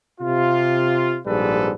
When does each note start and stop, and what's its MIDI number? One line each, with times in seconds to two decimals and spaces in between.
0.20 1.19 48
0.20 1.19 65
1.26 1.73 34
1.26 1.73 44
1.26 1.73 55
1.26 1.73 69
1.26 1.73 71